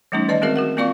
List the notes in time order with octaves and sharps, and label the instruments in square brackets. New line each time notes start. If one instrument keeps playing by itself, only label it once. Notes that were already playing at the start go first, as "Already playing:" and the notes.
[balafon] E3 G3 A3 C#4 D#4
D#3 D5 D#5 A5
G#3 C4 F#4 G#4 A#4 E5
F#4 A#4 F#5
A#3 C4 F4 D5 F5 C#6